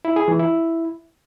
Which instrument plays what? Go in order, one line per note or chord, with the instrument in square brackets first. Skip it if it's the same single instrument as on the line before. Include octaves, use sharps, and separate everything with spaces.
[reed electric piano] E4
G#4
E3
E4